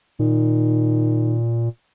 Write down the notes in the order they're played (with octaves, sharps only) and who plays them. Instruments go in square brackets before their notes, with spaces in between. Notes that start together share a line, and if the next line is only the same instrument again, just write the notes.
[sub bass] A#2 [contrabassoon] D#3